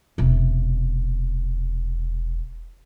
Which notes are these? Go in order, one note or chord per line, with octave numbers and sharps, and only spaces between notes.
E1 C3